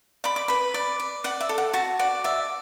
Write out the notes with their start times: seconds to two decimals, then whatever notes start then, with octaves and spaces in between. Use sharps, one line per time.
0.24 D5 B5
0.36 D6
0.48 B4 B5
0.74 D5
1.00 D5
1.24 D5 F#5
1.40 E5
1.49 A4
1.58 F#5
1.73 F#4 A5
1.99 D5 F#5
2.24 D5 E5